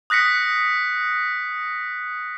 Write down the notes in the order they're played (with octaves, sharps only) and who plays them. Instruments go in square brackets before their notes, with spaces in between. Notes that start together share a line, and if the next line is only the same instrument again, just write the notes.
[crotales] D#6 F#6 A#6 B6 C#7